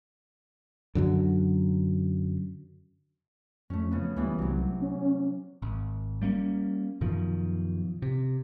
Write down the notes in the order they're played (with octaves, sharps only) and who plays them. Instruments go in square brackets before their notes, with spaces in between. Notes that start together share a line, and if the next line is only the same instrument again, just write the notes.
[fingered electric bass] F#2 D3 F#3
[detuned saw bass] F2 [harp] A3 C#4
[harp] C#3 B3
[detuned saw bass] D2 [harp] G2 E3 B3
[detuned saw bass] C2 [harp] C3 F#3
[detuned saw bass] C#4
[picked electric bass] G#1
G3 A#3 C4 C#4
F#2 B2 D#3 F3
C3